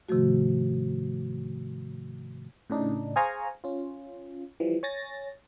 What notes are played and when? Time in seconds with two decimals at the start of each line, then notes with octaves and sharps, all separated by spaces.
0.09 G#2 C3 D#3 F3 A3 F#4
2.70 A2 C#3 D4 D#4
3.16 G#4 C5 F5 G#5 A#5 C#6
3.64 C#4 F4
4.60 E3 F3 G3
4.83 C#5 G#5 A6 A#6